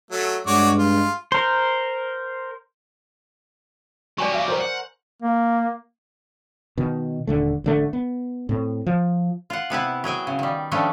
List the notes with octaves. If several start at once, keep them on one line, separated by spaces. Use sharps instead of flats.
F#3 A3
G2 G#3 F#4 C#5 D5
F4
A#4 C5
F#3 G4 D5 G#5 C#6
E5 F5 D6
A#4 C5
F#5
A#3
B2 D#3
D#1 D3 A3
A1 D3 A3
B3
A2 C4
F3
F4 F#5
C3 B3 E4 B4
F#3 G#4 G5 G#5
C#3
D#3 G3
D#3 F3 G3 A3 C#4 D4